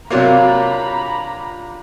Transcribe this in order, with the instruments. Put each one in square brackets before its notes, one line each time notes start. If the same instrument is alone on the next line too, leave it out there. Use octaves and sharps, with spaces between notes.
[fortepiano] C3 F#3 A#3 [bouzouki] D4 F4 G4 [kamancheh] A#5 B5